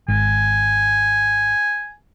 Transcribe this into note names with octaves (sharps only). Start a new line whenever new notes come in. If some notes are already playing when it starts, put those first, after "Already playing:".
G#1 G#5